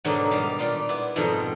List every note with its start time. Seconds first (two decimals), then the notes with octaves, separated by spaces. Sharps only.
0.05 G#2 B2 D3 D#3 F#3 A#3
0.31 D#3 G3 F5
0.59 A#2 G3 F4
0.89 B3 E4
1.16 F2 G#2 B2 D#3 A#5